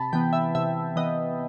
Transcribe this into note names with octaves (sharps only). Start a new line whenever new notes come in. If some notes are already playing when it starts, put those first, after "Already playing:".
Already playing: C3 A5 B5
E3 B3 G5
E5
C3 E5
E3 B3 D#5